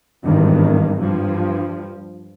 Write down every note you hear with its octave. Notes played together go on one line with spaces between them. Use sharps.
G#1 E2 G2 D#3
G2 F3